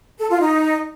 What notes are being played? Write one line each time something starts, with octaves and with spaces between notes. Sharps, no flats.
A4
F4
D#4